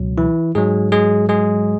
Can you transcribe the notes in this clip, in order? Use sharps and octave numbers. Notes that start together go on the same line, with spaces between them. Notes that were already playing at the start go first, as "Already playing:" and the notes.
Already playing: C#2 B2 F#3
E3 E4
G#2 F#3 G#3 G#4
G#3 G#4
G#3 G#4